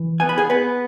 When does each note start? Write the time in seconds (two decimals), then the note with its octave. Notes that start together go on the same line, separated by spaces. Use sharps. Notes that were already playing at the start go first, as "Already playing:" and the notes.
Already playing: E3
0.20 B3 G#5
0.29 B5
0.38 G#4 G#5
0.50 B3 B4 B5